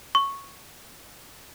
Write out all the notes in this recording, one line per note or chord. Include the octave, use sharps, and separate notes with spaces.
C#6